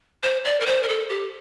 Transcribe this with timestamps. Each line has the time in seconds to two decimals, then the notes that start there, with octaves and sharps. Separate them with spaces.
0.23 C5
0.45 D5
0.60 A#4
0.66 C5
0.83 A#4
0.88 A4
1.09 G4